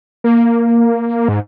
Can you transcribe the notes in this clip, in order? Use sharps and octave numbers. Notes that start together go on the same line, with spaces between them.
A#3
G#2